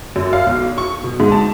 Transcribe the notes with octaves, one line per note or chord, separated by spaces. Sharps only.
F#2
F5
B1
C#6
B2
G#2
A5